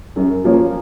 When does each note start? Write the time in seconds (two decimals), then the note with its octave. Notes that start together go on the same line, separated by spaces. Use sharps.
0.16 F#2
0.44 F3 A#3 C#4